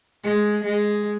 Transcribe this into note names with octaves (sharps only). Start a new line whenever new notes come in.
G#3
G#3